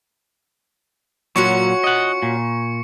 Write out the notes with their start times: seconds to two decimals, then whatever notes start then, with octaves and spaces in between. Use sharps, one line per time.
1.36 A#2 F#3 C#4 F4 F#4 C#6 C#7
1.84 D#5 F#5
2.23 A#2